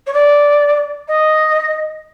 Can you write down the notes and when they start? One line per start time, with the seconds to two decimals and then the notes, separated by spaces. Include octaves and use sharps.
0.06 C#5
0.13 D5
1.08 D#5